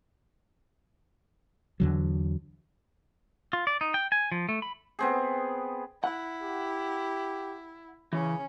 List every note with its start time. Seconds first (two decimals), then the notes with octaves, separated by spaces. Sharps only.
1.80 E2 D3 F#3
3.53 F4
3.67 D5
3.81 D#4
3.94 G5
4.12 G#5
4.32 F3
4.49 A3
4.62 B5
4.99 B3 C4 G#4
6.04 E4 F#5
6.42 G4
8.13 C#3 E3 C#4